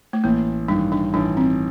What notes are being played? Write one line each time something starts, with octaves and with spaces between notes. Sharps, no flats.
A3
A1 A#3
G2 D#3 D4
D4
A1 D4
C4